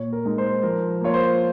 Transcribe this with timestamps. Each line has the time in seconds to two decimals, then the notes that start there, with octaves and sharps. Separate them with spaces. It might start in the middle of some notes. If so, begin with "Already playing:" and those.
Already playing: A#2 C#5
0.13 A#4
0.25 G#3 D#4
0.38 C5
0.63 F3 A#4
1.01 A#3 F4 C#5
1.14 C5